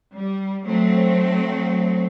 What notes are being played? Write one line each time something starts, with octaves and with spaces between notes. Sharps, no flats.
G3
F#3 A3 C4